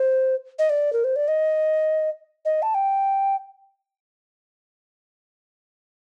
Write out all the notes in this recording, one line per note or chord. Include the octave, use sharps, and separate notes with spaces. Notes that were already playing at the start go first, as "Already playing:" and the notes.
Already playing: C5
D#5
D5
A#4
C5
D5
D#5
D#5
A5
G5